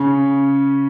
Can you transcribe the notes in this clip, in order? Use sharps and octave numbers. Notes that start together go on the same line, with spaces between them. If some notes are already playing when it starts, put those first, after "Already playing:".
Already playing: C#3 C#4